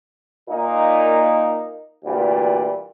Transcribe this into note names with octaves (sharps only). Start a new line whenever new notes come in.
A#2 A#3 D#4
D2 A#2 E3 G3